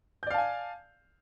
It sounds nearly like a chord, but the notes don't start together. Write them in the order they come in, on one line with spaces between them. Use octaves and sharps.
G6 D5 F5 A5 G#5